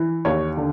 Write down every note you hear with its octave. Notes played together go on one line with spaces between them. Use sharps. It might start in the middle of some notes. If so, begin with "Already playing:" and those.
Already playing: E3
D#2 C#5
D3